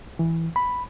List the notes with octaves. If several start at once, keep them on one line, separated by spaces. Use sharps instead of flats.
E3
B5